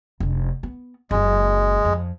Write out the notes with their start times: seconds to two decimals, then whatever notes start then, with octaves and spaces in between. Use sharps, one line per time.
0.20 F1 D4
0.63 B3
1.11 F#1 F#2 G#3
1.85 F2